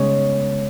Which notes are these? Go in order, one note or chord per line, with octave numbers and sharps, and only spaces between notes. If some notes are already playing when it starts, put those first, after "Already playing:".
Already playing: C#3 G#3 B3 C#4